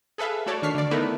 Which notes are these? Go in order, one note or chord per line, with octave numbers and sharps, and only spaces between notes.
G#4 A4 B4 E5 F5
A3 F#4 A4 C#5 D5
D#3 D4 C#6 F6 B6 C7
D3 D5
A3 B3 D#4 E4 A#4 B4